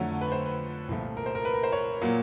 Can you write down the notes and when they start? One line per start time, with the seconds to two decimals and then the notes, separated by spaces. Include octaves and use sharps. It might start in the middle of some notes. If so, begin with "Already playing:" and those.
Already playing: F2 D3 F#3 A3 C#5
0.21 B4
0.32 C5
0.46 B4
0.89 C2 A#2 F3 A3
1.17 A#4
1.26 C5
1.35 A#4
1.45 B4
1.54 A#4
1.63 C5
1.72 C#5
2.01 A#2 F#3 A#3